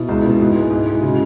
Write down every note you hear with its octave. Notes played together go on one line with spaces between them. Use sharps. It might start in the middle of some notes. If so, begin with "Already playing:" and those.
Already playing: B2 E4
C#2
B2
G#2
G#3
G#2
G#3
E4
C#3 F#4